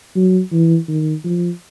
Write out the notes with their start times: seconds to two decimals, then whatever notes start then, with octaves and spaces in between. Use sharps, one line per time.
0.15 F#3
0.52 E3
0.88 D#3
1.25 F3